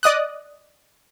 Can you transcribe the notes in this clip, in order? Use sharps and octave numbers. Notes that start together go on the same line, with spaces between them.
D5 D#5 D#6 F#6